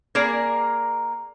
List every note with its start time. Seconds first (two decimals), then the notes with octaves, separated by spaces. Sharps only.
0.15 A#3 G#4 A#4 D5